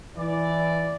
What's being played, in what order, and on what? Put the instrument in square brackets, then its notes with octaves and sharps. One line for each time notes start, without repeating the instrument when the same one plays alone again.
[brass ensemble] E3 D5